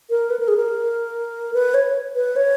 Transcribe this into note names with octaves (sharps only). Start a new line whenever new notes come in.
A#4
B4
A#4
G#4
A#4
B4
C#5
B4
C#5